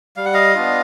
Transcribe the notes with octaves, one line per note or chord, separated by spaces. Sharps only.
G3 F5
F#5
D#5 F5
B3 D4 F4